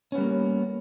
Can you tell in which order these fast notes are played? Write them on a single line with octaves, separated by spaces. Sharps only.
C#4 B3 G3 A#3